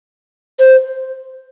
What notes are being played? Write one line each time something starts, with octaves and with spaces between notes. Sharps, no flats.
C5